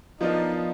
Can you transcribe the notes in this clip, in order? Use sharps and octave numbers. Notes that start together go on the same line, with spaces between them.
F3 B3 D4 D#4 F4 A#4